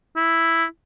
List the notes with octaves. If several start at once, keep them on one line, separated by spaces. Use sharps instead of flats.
E4